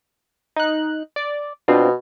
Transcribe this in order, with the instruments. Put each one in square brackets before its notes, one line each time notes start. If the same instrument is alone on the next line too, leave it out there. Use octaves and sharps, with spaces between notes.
[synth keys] D#4 F#6
D5
[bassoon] B2 [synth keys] C4 D4 F4